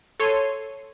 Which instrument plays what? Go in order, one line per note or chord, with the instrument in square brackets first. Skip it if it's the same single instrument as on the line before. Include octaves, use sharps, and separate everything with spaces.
[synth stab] A4 C#5 C6 D#7